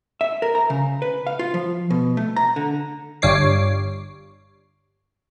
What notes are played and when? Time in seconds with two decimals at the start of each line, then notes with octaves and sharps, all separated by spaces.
0.21 E5
0.42 A#4
0.55 A#5
0.70 C#3
1.02 B4
1.27 F5
1.39 F4
1.54 F3
1.90 B2
2.17 A3
2.36 A#5
2.56 D3
3.22 G1 G2 G3 C#5 D6 C7